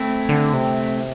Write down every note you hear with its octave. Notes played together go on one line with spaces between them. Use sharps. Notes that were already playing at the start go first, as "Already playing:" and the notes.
Already playing: A3 C4 E4
D3
C3